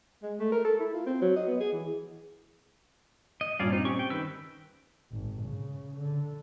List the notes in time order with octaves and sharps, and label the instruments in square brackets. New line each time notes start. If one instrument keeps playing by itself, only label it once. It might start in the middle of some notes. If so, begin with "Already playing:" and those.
[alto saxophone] G#3
A3
A#4
A4
E4
F4
C4
F#3
D#5
B3
G#4
E3
[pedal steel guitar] D#5
[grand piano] G2 A#2 [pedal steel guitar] C#4 D5 F5
[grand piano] C4 [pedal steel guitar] D#4
[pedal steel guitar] C#4 G4 C#6
G5
D#3 B4 E6
[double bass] G#1
C#3
D3